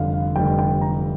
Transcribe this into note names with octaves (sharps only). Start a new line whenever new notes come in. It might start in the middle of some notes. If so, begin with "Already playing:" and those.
Already playing: F1 F2 D3 G3 F5
F5
F1 F2 D3 G3 G5
G5
A#5